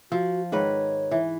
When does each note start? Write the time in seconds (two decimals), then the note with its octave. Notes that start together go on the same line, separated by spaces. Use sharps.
0.12 F3 F#4
0.52 G#2 D#3 B4 C#5
1.11 E3